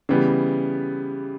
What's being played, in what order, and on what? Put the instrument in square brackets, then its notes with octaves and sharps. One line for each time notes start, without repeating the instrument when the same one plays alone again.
[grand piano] C#3 E3 G3 B3